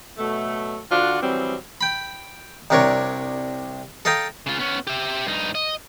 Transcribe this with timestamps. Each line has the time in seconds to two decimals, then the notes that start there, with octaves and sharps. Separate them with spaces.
0.18 B2 F#3 A3
0.91 D3 D4 F4 F#4
1.22 E3 F#3 G3 C4
1.81 G5 B5
2.70 C2 C3 D4 A#4 C#5 C#6
4.05 A4 D#5 F5 G5 A#5
4.47 C#3 F4
4.59 B3 C#4
4.87 G4 E5
5.27 G2 D#4
5.55 D#5